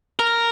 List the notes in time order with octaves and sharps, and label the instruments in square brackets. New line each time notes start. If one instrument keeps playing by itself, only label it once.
[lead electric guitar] A#4